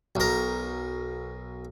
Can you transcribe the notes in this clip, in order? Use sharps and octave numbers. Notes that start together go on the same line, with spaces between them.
B1 A#4